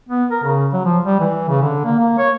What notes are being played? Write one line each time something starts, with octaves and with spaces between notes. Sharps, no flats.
B3
A#4
C#3
F#3
F3
G3
E3
C#3
D3
A#3
A#3
C#5